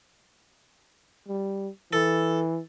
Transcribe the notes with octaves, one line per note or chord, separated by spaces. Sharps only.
G3
E3 A4